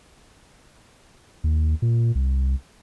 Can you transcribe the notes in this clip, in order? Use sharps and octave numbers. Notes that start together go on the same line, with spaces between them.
D#2
A#2
C2